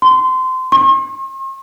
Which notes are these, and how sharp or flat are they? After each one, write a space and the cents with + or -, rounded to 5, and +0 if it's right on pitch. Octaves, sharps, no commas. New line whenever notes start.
C6 -20
C6 +45